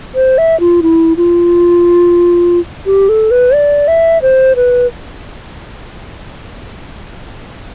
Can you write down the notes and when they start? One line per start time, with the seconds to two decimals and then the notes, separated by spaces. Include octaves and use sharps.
0.15 C5
0.38 E5
0.60 F4
0.82 E4
1.17 F4
2.86 G4
3.09 A4
3.31 B4
3.54 D5
3.88 E5
4.22 C5
4.56 B4